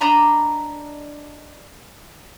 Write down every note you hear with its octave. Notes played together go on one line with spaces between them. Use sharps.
D4 D#5 A#5 B5